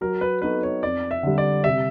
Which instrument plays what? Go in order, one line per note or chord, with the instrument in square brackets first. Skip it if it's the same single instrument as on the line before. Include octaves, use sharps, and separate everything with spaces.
[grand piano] F#3 [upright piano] A#4
[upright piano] B4
[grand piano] B3 D#4 F#4 A4 [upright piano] B4
[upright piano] C#5
[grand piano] F2 [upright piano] D5
[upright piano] E5
[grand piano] D3 G3
[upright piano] D5
[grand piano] C3 [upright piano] E5